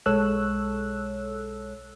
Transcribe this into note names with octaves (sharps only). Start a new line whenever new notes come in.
B1 G#3 A4 C#5 E6 F#6